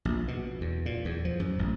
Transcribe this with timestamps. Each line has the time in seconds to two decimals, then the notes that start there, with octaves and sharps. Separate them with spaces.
0.05 A#1
0.28 B2
0.61 E2
0.86 A#2
1.05 E2
1.25 F3
1.40 F#2
1.59 A1